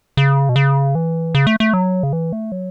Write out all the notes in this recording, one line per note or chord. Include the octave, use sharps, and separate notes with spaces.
C#3
B2
C#3
E3
C#3
A3
A3
F#3
C#3
E3
A3
F#3